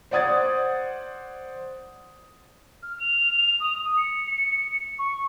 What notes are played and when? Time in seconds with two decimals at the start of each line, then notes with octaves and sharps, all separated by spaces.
0.11 C5 D5 F#5 D#6 G#6 A6
2.82 F6
2.99 F7
3.60 D#6
3.97 C#7
4.26 C#7
4.98 C#6